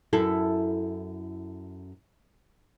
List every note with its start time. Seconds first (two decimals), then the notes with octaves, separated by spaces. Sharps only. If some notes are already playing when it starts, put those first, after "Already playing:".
0.13 F#2 E4 A4